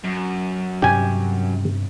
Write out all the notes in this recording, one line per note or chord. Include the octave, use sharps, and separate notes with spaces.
F#2
G2 C3 C#4 G4 G#5